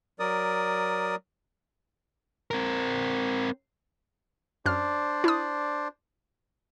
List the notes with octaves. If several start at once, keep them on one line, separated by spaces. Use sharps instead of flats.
F#3 A#4 D5 D#6
C4 A#4
F#2 D4 C5 D5 F6
E4 D#6